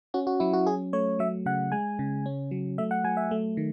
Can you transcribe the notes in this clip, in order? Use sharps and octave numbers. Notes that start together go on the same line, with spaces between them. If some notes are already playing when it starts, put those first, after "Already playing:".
C#4 F#4
F#4
F#3 E4
F#4
C#4 G#4
A3 C#5
F#3 E5
C#3 F#5
G#3 G#5
C#3
C#4
F#3
A3 E5
F#5
F#3 G#5
E5
A3
D#3